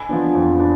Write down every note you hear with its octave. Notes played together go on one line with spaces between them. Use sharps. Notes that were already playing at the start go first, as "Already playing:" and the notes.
Already playing: G#5 B5
F3 B3 D4
F2
D4